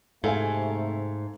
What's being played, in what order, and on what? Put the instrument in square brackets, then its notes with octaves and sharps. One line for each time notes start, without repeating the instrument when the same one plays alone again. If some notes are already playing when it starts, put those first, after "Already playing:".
[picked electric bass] G#2 [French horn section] C3 A3 [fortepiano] A4 F5 G#5